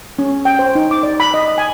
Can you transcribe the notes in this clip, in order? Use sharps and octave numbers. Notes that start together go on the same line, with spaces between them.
C#4
G5
C5
D#4
D6
D5
B5
D#5
G#5